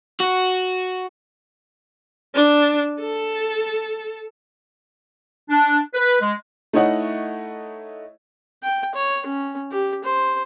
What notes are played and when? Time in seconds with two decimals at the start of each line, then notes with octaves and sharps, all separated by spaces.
0.20 F#4
2.34 D4
2.99 A4
5.49 D4
5.94 B4
6.21 G#3
6.73 A3 D#4 E4 C#5 D#5 F#5
8.63 G5
8.95 C#5
9.26 C#4
9.71 G4
10.04 C5